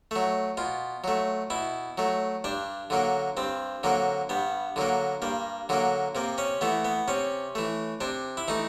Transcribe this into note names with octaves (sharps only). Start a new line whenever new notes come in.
F#3 A3
B2 F4
F#3 A3
B2 E4
F#3 A3
G2 D4
D3 F#3 A#3
G2 C4
D3 F#3 A#3
G2 B3
D3 F#3 A#3
G2 A#3
D3 F#3 A#3
C3 A#3
C#4
E3 A3 B3
B3
C3 C#4
E3 A3
C3 D4
E4
E3 A3 D#4